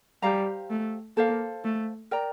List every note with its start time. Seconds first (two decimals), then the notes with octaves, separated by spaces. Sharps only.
0.22 G3 G4 C5 F5 A#5
0.70 A3
1.16 A#3 A4 C5 F5
1.64 A3
2.11 A#4 D5 G5 A#5